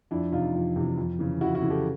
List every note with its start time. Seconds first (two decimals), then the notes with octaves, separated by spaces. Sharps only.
0.11 F2 D4 E4
0.32 C3 E3 D#4 F4
0.54 F2
0.76 C3 E3
0.98 F2
1.19 C#3 E3
1.41 F2 E4 F#4
1.55 E4 F#4
1.62 C#3 E3
1.70 G4 A4